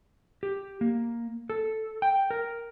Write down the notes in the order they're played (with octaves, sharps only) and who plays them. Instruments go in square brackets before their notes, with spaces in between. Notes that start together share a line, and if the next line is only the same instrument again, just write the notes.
[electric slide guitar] G4
A#3
A4
G5
A#4